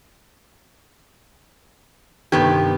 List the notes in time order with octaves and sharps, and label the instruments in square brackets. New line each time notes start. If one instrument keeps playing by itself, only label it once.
[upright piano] G1 D#3 G#6 [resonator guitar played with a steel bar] C3 B3 G4